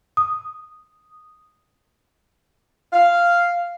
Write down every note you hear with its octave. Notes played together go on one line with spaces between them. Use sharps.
D#6
F5